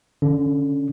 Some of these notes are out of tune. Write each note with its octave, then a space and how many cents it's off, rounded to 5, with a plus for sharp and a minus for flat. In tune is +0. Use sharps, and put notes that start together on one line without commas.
D3 +0 C#4 +10